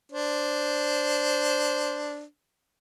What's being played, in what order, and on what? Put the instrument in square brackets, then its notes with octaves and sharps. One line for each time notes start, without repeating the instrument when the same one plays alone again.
[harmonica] D4 C5